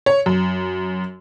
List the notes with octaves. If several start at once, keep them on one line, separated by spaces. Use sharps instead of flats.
C#5
F#2